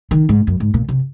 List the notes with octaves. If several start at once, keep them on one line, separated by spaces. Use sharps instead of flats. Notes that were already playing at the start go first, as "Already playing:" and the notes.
D#3
G#2
F#2
G#2
A#2
C3